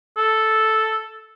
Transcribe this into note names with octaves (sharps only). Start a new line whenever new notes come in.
A4